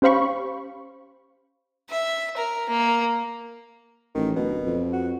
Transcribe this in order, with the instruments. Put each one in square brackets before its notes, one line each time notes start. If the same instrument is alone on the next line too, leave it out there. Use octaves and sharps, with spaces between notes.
[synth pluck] C#4 G4 C5 F5 B5 C#6
[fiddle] E5
A#4
A#3
[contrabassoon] A1 [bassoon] D#3
[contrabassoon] D1 [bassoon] B2
[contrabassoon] F2
[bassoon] F#4